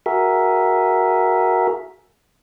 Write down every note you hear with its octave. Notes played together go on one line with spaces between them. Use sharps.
F#4 G#4 A#4 E5